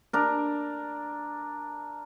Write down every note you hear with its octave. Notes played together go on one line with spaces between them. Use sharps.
D4 A#4